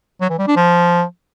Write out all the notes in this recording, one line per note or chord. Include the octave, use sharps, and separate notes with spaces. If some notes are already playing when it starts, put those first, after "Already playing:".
F#3
E3
G3
D4
F3